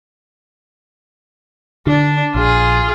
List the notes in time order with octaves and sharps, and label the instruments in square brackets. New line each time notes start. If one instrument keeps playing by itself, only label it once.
[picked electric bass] D3 [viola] D4
[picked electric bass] A#1 [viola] F4 G#4